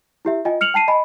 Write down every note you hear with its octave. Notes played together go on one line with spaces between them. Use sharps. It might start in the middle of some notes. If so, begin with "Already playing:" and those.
E4 G4 E5
F4 D#5 G5 G#5
F6 C#7 F7 F#7
G5 A5 C7 D#7
D#5 G#5 B5